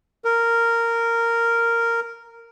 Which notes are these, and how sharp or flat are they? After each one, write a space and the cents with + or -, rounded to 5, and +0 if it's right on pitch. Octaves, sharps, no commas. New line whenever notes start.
A#4 -10